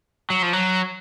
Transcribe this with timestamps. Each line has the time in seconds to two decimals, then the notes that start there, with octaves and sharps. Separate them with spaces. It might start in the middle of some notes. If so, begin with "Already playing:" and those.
0.30 F#3
0.42 F3
0.53 F#3